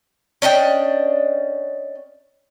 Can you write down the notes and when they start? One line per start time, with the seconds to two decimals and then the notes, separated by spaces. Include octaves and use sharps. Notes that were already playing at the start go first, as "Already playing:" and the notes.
0.42 C#4 D4 D#5 G5